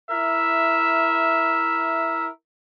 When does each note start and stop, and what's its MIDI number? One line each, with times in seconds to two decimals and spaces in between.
0.10 2.28 64
0.10 2.28 70
0.10 2.28 76